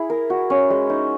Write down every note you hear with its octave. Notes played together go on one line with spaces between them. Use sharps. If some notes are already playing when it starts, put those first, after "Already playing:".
Already playing: E4 G#4
A#4
F#4
C#4
G#3
D#4